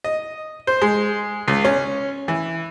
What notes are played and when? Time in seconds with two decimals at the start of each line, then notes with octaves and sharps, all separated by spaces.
0.04 D#5
0.67 C5
0.82 G#3
1.48 C#2
1.64 C#4
2.28 E3